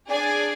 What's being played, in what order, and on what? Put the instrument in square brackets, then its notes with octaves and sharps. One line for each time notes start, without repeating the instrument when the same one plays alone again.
[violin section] D4 G#4 D5 G#5